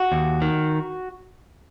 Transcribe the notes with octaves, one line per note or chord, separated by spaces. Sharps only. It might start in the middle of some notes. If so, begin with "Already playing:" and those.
Already playing: F#4
D#2
D#3